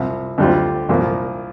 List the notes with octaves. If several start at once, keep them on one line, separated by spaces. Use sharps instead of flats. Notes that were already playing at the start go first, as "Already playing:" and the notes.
Already playing: C2 C3 F3
D2 D3 G3 C4 F4
C2 A#2 F3